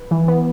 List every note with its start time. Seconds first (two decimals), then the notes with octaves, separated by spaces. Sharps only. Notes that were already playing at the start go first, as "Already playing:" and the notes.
Already playing: B4
0.11 E3
0.28 B3